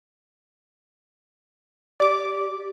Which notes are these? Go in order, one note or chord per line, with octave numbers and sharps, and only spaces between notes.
G4 D5 D6